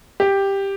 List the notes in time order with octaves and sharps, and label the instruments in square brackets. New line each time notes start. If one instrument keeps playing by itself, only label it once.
[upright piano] G4